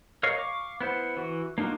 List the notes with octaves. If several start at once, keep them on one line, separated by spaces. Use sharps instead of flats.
A#4 C#5 D#5 F5
F5 C#6 D6
B3 E4 C5 F#5
E3 F#4
A#3 D4 D#4 F4 F#4